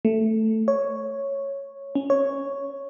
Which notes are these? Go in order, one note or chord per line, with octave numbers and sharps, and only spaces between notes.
A3
C#5
C#4
C#5